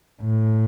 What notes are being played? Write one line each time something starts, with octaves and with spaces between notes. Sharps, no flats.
A2